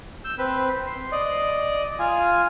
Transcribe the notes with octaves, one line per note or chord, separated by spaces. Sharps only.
E6 G6
C4 B4
C6
D5 D#5
F4 G#5